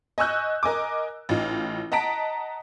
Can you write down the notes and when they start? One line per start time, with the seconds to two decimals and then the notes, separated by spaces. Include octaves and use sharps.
0.18 D#5 G#5 C#6 E6 F#6 G6
0.63 A#4 D#5 G#5 D6
1.29 A1 D#4 F4
1.92 D#5 F#5 A5 A#5 B6 D7